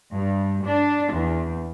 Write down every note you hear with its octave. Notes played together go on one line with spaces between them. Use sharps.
G2
D4
E2